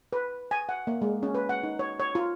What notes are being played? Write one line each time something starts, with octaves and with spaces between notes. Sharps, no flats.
B4
G#5
F#5
A#3
G#3
C#4
B4
F#5
D#4
C#5
C#5
F4